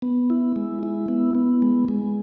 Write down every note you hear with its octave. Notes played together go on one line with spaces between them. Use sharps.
B3
E4
G#3
E4
B3
B3
G#3
G#3